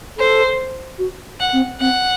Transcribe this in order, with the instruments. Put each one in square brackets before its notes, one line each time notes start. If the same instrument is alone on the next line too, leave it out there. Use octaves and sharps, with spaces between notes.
[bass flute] A4 [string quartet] C5
[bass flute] F#4
[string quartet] F#5
[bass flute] C4
[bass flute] C4 [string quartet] F#5